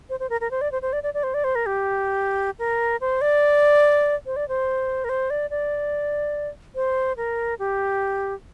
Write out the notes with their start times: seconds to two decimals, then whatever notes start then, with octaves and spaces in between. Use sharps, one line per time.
0.10 C5
0.20 C5
0.30 A#4
0.41 A#4
0.51 C5
0.61 D5
0.72 C5
0.82 C5
0.93 D5
1.03 D5
1.14 D5
1.23 C5
1.34 D5
1.44 C5
1.55 A#4
1.66 G4
2.59 A#4
3.01 C5
3.21 D5
4.26 C5
4.36 D5
4.49 C5
5.04 A#4
5.09 C5
5.30 D5
5.50 D5
6.75 C5
7.17 A#4
7.59 G4